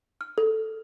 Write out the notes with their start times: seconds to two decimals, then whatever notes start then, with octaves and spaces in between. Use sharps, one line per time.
0.21 F6
0.38 A4